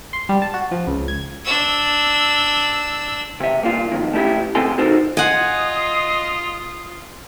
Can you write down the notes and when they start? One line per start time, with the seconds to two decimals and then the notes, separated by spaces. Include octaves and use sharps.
0.13 C6
0.29 G3
0.42 A5
0.54 F#4
0.71 F3
0.87 C#2
1.08 G#6
1.45 D4 E6
3.40 C3 E5
3.61 C2 A#3 F4
3.92 B1 F2 D#3
4.13 A3 C#4 E4 G4
4.55 C#3 A3 C4 A4 G#5 C6
4.78 D#4 F#4 A4 A#4 C5
5.17 F4 D#5 F#5 G#5 D#6